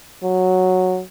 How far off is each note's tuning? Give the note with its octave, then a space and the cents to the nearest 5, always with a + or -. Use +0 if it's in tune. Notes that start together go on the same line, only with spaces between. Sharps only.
F#3 -5